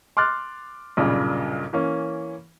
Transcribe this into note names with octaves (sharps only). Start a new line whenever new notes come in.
C6 D6 F6 F#6 A6
B1 G2 A#2 C#3
E3 A#3 C#4